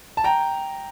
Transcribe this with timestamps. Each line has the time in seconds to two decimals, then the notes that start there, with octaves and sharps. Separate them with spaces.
0.17 A5
0.24 G5 A#5